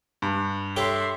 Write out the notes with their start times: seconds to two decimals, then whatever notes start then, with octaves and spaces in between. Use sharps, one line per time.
0.22 G2
0.76 G4 A4 C#5 E5 C6